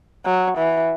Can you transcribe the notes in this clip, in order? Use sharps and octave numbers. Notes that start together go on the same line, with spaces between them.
F#3
E3